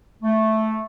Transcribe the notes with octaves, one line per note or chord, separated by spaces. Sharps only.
A3